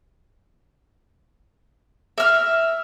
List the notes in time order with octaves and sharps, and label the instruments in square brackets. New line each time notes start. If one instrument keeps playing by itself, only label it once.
[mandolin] E5 F6